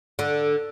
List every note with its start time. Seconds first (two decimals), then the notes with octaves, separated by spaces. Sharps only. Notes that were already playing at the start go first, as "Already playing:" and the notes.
0.19 D3